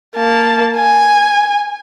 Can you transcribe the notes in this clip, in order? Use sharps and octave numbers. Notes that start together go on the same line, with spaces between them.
A#3 A5
G#5